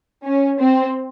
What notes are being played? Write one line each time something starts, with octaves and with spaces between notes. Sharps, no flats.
C#4
C4